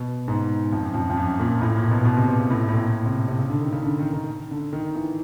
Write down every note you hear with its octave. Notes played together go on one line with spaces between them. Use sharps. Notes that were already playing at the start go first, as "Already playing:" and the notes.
Already playing: B2
G#2
F2
F#2
F2
F2
F#2
A#2
A2
A#2
B2
B2
C3
C3
C#3
A2
A2
A#2
C3
C3
C#3
D3
D#3
C#3
D3
D#3
D#3
D3
D#3
E3